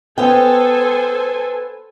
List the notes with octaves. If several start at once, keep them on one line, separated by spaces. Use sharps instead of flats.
B3 C#4 A4 C5 G5 G#5